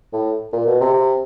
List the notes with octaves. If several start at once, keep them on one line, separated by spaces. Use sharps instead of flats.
A2
A#2
B2
C3
C3